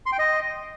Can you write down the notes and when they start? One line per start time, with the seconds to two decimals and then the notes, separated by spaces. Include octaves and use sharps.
0.06 C6
0.12 G5
0.19 D#5